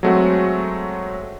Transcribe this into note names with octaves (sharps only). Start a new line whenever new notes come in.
F#3 G#3 A3 C4 F#4